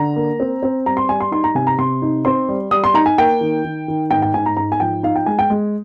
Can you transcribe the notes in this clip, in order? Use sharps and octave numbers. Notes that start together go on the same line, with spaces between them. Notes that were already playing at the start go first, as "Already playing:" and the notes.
Already playing: D3 A#5
A#3
C4
C4
G3 A#5
C6
G3 G#5
C6
D#4 C6
A#5
C3 G#5
A#5
C3 C6
D#4
C4 C6
G3
G3 D#6
C6
D#4 A#5
G#5
A#3 G5
D#3
D#3
D#3
G#2 G5
G5
G#2 G#5
A#5
G#2 A#5
G#5
F3 G5
D#4 F5
G5
G#3 G#5
G5
G#3